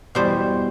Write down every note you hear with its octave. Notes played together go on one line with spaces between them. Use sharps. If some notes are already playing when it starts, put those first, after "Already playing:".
E2 B2 G3 C5